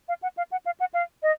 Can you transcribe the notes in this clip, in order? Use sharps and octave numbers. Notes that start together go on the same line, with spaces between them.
F5
F#5
F5
F#5
F5
F#5
F5
D#5